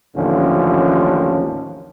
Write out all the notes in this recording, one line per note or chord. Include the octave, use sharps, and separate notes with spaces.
A1 D#2 D3 F3 C#4